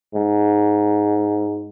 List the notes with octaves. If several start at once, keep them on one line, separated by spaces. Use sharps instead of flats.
G#2